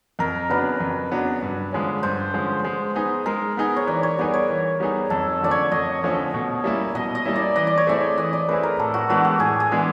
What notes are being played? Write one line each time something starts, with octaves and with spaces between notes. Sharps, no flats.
F2 A#4
C#3 F#3 B3 D4 B4
F2
C#3 F#3 B3 D4
G2
D3 F3 G#3 C#4
G2 C5
D3 F3 G#3 C#4
G#3
B3 D#4 G#4
G#3 A#4
B3 D#4 G#4
C#5
E3 D5
C#5
G3 B3 D#4 G#4 D5
C#5
E3
G3 B3 D#4 G#4
F2 A4
D3 F3 A3 C#4 D5
C#5
F2 D#5
D3 F3 A3 C#4
B2
G3 A#3 C#4 E4
B2 D#5
D#5
G3 A#3 C#4 E4
D5
E3 D#5
D5
C#5
A3 C4 E4 G#4 D5
E3 D#5
D5
A3 C4 E4 G#4 B4
A#4
A2 A4
F#4
E3 G#3 B3 D4 F#4
G4
A2 G#4
G#4
E3 G#3 B3 D4